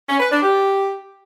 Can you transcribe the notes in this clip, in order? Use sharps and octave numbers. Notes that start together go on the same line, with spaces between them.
C#4
B4
D4
G4